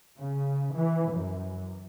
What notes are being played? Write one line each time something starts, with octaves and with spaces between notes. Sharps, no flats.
C#3
E3
F#2